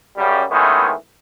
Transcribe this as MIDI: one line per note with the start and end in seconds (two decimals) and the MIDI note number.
0.17 0.44 42
0.17 0.44 49
0.17 0.44 55
0.50 0.92 51
0.50 0.92 52
0.50 0.92 56
0.50 0.92 57
0.50 0.92 59
0.50 0.92 61